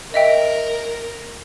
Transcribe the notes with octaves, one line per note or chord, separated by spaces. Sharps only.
A#4 D#5 E5 G5